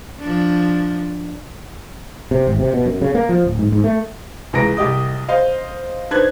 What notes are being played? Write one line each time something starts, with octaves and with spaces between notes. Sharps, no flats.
F3 D4
C3
G#1
C3
B2
F#2
C#3
A#3
F3
D1
G#2
G#2
A3
C#2 E3 G#3 A#5 A#6 D7
C2 G4 D#5 D#6
C5 D#5 F5
D4 D#4 B4 C5 F#6 G#6